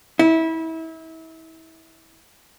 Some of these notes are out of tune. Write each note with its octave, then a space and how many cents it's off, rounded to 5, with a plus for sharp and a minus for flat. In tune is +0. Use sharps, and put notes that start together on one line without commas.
E4 -30